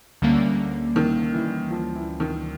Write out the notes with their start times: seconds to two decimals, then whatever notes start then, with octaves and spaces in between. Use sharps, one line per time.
0.22 D2 D3 G3 A#3 C#4
0.96 D#3
1.34 E3
1.71 F3
1.95 E3
2.20 D#3